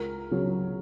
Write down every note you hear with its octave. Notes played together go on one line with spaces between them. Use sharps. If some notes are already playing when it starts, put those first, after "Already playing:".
Already playing: C#2 A#4
C#3 F#3